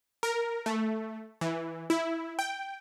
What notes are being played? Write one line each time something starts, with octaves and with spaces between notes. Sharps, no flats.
A#4
A3
E3
E4
G5